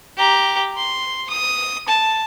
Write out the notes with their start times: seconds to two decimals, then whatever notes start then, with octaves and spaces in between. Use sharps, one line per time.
0.17 G4 A#5
0.77 C6
1.30 D#6
1.88 A5